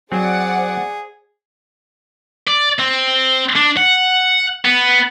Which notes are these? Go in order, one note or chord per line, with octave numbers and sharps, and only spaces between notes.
F#3 C4 G#4 C5 D5 F#5
D5
C4
D4
F#5
B3